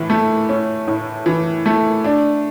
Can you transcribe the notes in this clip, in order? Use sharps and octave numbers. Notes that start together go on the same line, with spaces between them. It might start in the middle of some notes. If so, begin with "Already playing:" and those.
Already playing: A2 E3
A3
C#4
A2
E3
A3
D4